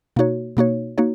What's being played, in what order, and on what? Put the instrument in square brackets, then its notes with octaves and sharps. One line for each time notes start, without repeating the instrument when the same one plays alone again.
[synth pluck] B2 A#3 D#4 F#4 C#5
B2 A#3 D#4 F#4 C#5
A#3 D#4 F#4 C#5